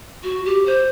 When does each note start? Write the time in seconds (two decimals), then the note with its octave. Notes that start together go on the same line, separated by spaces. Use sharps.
0.24 F#4
0.45 G4
0.66 C5